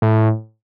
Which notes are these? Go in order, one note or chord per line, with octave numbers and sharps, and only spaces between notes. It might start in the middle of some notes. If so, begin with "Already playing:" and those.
A2